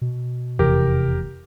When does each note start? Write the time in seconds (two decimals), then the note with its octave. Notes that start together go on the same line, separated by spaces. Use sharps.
0.02 B2
0.59 F1 E2 C3 G4 A#4